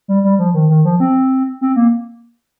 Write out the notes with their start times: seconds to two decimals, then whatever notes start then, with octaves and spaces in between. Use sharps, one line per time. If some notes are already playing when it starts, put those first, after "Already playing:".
0.08 G3
0.24 G3
0.39 F3
0.54 D#3
0.69 D#3
0.85 F3
1.00 C4
1.61 C4
1.76 A#3